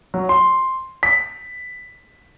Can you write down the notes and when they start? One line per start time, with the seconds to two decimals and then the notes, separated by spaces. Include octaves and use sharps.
0.14 F#3
0.29 C6
1.03 B6